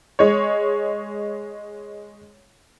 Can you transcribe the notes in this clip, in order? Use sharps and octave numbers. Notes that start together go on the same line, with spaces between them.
G#3 C#5